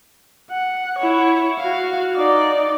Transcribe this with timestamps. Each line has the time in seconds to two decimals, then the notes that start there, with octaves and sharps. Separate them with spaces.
0.50 F#5
0.99 E4 C#5
1.59 F#4 F5
2.16 D#4 D5